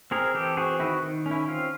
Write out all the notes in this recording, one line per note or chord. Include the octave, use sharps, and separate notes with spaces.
C4 G#4 A#4
E3 G4 A4
C4 F#4 G#4
D#3 E4 F#4
D#3
C#4
E4
C4 F4